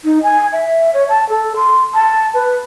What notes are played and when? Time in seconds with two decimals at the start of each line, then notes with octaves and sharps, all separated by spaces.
0.04 D#4
0.23 G#5
0.52 E5
0.94 C#5
1.09 A5
1.29 A4
1.56 C6
1.94 A5
2.34 B4